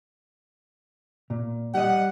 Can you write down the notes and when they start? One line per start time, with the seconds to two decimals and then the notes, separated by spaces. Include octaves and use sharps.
1.30 A#2
1.74 G3 D#5 F#5